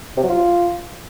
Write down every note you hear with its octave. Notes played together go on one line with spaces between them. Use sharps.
C3
F#3
F4